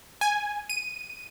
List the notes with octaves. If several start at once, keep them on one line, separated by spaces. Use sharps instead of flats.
G#5
D#7